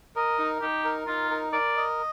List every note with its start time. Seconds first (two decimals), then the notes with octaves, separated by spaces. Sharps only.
0.16 A#4 D#5
0.39 D#4
0.61 D#4 G4
0.84 A#4
1.07 D#4 F4
1.31 A#4
1.53 A#4 D5
1.77 D#5